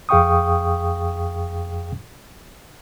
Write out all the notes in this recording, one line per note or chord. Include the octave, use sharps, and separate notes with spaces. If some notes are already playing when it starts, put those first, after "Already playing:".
F2 G#4 F5 G5 C#6 D#6